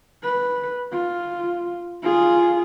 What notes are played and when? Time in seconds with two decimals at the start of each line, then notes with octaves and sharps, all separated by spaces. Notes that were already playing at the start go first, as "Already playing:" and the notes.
0.23 B4
0.92 F4
2.03 F4 G#4